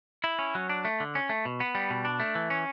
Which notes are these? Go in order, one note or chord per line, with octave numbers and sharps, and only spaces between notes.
E4
C#4
F#3
D4
A3
D3
C#4
A3
B2
B3
G3
B2
D4
A3
E3
C#4